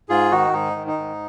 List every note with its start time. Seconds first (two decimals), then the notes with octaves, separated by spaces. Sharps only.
0.09 G#2 F4 G#4
0.31 D#3 D#4 F#4
0.53 G#2 D#4
0.76 D#3
0.87 D#4
0.98 G#2